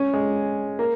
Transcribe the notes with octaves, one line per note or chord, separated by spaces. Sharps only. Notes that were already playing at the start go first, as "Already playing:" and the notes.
Already playing: C#4
G#3
A#3